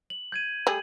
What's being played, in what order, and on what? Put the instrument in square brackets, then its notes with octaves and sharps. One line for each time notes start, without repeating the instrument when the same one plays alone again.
[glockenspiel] F#7
G6 G#6 D#7
[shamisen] G3 A3 G#4 [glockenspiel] F#7